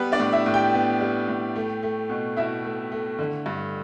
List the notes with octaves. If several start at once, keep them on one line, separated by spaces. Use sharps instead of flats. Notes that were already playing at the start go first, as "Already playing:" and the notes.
Already playing: G3 B3 B4
D4 D5
A2
E4 E5
A2
G4 G5
B3
G3
A2
A3
A3
B2
B2 E4 E5
A3
A3
D3
G2